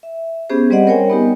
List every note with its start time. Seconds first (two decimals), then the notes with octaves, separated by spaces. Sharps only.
0.03 E5
0.50 B3 C#4 G4 G#4 C5
0.70 G3 C4 C5 D5 D#5 F#5
0.87 A#4 C5 C#5 G5 G#5
1.10 B3 D#4 G4